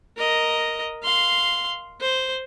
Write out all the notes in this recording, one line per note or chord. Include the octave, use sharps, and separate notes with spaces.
A#4 D#5
F5 C6
C5